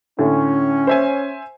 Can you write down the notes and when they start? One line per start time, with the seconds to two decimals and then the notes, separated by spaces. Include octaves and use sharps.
0.19 A2 D3 C#4
0.87 C5 E5 G#5